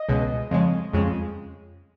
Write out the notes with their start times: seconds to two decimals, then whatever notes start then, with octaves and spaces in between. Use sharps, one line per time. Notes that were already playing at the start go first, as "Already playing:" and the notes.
Already playing: D#5
0.09 C#2 B2 G#3
0.51 F2 C#3 G#3
0.93 F2 C#3 G#3